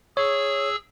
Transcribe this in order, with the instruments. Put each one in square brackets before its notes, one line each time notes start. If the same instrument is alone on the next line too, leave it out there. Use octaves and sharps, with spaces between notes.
[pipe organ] G#4 E6 [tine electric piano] C#5